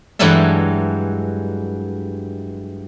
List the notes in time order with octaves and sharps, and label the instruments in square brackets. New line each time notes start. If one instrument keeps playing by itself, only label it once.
[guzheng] G2 E3 F#3 G#3 A4 E5